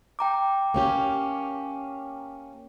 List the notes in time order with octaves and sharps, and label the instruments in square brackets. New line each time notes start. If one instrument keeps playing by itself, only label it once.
[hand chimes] G5 A#5 D6
[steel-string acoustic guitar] A#3 C#4 G4